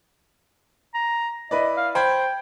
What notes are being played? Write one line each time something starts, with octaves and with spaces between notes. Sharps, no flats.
A#5
E4 B4 D5 D#5
F5
C5 G5 B5 G#6